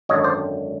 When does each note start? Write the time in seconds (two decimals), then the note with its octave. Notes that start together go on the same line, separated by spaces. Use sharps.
0.09 G#1 F#2 D3 C#5 D#5
0.24 C5 D5